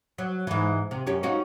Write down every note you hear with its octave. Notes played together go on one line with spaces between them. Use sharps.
F#3
G#2 E3
C3
F#2 C#4 G4
C#4 D#4 F#4